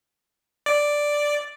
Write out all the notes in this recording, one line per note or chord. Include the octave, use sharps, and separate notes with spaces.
D5